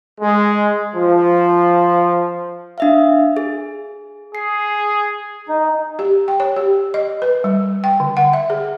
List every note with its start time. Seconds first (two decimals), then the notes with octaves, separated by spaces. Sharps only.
0.20 G#3
0.94 F3
2.78 D4 E5 F5
3.37 G#4
4.35 G#4 C7
5.49 D#4
5.99 G4
6.28 G5
6.40 C#5
6.56 G4
6.94 D#5
7.22 B4
7.44 G3
7.84 G5
8.00 D3
8.17 F#5
8.33 E5
8.50 G#4